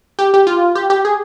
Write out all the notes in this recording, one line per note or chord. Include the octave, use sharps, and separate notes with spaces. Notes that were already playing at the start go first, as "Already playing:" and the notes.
G4
G4
F4
G4
G4
G#4